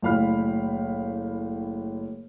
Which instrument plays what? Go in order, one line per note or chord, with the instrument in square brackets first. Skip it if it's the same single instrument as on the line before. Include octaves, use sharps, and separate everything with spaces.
[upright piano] F#1 A2 F5 B5 F6